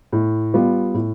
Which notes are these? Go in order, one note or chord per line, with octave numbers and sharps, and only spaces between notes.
A2
G3 B3 F4
A2